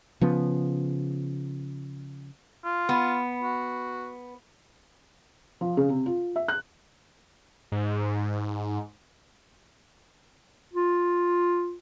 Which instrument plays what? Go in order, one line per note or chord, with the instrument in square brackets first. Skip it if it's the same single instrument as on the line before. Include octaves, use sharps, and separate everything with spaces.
[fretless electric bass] C#3 F3 B3
[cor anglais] F4
[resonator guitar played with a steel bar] B3
[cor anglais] F#4
[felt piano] F3
C#3
C3
F4
E5
F#6
[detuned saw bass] G#2
[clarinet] F4